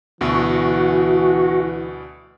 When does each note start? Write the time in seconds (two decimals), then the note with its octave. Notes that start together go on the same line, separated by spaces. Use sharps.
0.21 D2 B2 E3 F#4